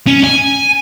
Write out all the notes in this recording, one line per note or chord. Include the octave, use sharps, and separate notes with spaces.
C#4
G#5